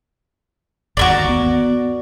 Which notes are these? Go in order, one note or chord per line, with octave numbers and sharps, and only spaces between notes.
G1 D#2 F#4 A#4 D5
B3